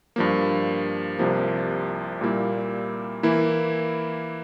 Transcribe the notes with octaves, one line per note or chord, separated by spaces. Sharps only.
G2 F3 A#3
C2 C3 F3 A#3
A#2 G3 A#3 E4
E3 A#3 E4